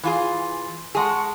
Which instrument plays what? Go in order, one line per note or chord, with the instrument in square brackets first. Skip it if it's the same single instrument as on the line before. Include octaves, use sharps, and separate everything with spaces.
[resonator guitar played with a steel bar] E3 F4 G#4
[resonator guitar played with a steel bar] G#3 G#4 [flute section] F#5 A5 C#6